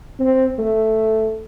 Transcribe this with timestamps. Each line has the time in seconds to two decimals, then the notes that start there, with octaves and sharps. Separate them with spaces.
0.20 C4
0.59 A3